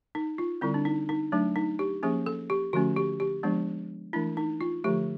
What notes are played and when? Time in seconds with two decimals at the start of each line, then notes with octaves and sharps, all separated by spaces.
0.15 D#4
0.38 F4
0.61 D3 G3 C4 E4
0.74 D4
0.85 D#4
1.09 D#4
1.32 F#3 A3 D4
1.56 D#4
1.79 G4
2.03 F3 A#3 C#4 G#4
2.26 A4
2.50 G4
2.73 D3 F3 A3 C#4 F#4
2.96 G4
3.20 G4
3.43 F3 G#3 B3 D4
4.13 E3 A3 D4 E4
4.37 D#4
4.61 F4
4.84 D3 F3 A3 G4